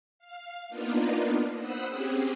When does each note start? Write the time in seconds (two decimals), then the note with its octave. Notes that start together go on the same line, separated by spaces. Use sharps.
0.19 F5
0.69 A#3 B3 D4 D#4 F4
1.56 C5 F#5 B5 D#6 E6 F#6
1.88 C4 C#4 G4 G#4